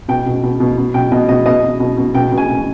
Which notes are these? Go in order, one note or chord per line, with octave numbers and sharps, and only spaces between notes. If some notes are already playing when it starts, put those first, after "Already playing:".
B2 G5
B2
B2
B2
B2
B2 G5
B2 D#5
B2 D#5
B2 D#5
B2
B2
B2
B2 G5
B2
G#5
B2